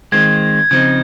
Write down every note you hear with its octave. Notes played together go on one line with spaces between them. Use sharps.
D#3 G#3 C4 F4 G#6
C#3 F3 C4 D#4 G#6